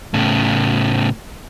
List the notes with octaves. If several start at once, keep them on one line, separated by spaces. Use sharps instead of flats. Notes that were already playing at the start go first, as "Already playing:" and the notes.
A2 C#3